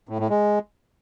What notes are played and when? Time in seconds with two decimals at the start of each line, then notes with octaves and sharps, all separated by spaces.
0.09 A2
0.19 A2
0.30 G#3